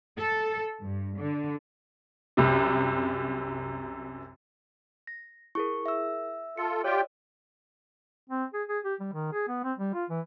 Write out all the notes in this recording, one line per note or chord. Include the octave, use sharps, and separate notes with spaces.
A4
G2
D3
C2 F#2 C3
A#6
E4 G#4 A#4 C#6
E5 E6
F4 A4 C#7
F4 G4 C#5 D5 G5
C4
G#4
G#4
G4
G3
D#3
G#4
B3
C4
G3
F4
E3